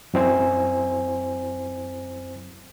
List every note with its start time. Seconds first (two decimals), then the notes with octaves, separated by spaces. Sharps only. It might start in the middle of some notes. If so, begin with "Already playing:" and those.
0.14 F#2 F#3 C4 E4 C5 G#5